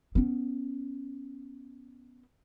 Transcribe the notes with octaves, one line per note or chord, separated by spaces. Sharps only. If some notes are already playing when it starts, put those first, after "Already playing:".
B3 C#4